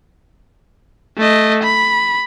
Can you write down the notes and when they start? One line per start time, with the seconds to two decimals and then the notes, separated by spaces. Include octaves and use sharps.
1.17 A3 D#5
1.63 B5